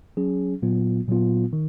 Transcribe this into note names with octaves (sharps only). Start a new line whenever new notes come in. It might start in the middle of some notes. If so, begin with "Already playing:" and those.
F#3 C#4 G#4
A#2 F#3 B3 F4
A#2 F#3 B3 F4
D#3